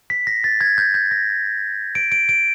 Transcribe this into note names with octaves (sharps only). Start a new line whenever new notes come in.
B6
A#6
A6
G#6
G6
G6
A#6
D7
D7
D7